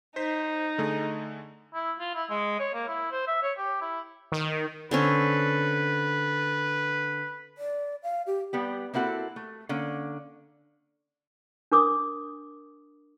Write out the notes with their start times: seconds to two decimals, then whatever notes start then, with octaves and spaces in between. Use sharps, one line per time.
0.16 D#4 C5 B6
0.78 D3 A3 G#4
1.74 E4
2.00 F4
2.15 E4
2.30 G#3
2.60 C#5
2.74 A#3
2.88 E4
3.12 C5
3.27 E5
3.43 C#5
3.58 G4
3.81 E4
4.32 D#3
4.91 D3 C4 C#4 B4
7.58 D5
8.03 F5
8.27 G4
8.53 G3 B3 G4
8.94 A#3 C4 E4 F#4 A4
9.36 A3
9.69 D3 A#3 C#4
11.72 D4 A#4 D6 D#6